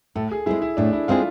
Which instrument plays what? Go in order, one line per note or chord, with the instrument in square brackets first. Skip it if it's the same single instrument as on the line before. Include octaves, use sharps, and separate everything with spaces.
[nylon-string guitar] A2 [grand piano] A4
[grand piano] G#4
[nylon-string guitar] G#3 C4 G#4 [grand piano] E4
[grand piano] E4
[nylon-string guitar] A2 [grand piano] D4
[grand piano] E4
[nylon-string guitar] G#3 C4 G#4 [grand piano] F4